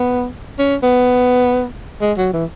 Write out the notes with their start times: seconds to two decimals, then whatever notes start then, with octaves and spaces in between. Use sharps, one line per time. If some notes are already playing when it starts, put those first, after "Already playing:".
Already playing: B3
0.59 C#4
0.83 B3
2.01 G#3
2.17 F#3
2.33 E3